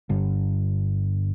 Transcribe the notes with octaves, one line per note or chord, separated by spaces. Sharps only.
G1